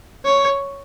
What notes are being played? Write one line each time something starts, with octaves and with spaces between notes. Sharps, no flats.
C#5